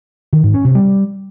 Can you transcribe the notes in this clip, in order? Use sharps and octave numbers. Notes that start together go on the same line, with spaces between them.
D#3
G#2
C#4
C3
G3